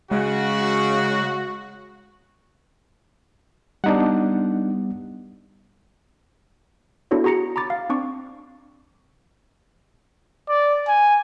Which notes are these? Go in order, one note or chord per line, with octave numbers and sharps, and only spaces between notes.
C#3 G#3 F#4
G3 B3 D4 D#4 F#5
B3 D4 E4 F#4 A4 C#5
F#4 G#4 A#5 A#6 C#7
A#5 B5 D6 A6
F5
C4 D4 C#6 D6
D5
G#5